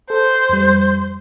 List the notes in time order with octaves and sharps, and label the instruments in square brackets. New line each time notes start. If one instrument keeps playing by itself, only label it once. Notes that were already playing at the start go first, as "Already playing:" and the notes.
[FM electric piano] A4 [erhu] C5
[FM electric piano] F2 G3